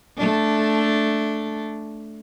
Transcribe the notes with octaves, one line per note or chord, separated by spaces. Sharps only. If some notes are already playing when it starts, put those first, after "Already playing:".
A3 D4